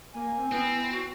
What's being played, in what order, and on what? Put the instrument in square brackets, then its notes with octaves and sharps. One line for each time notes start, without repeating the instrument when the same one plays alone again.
[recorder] A#3 [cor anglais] G#5
[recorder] C4
[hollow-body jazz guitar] B3 [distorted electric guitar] C4 [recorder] E4
[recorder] F#4